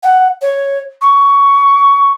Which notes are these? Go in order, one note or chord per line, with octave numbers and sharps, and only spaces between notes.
F#5
C#5
C#6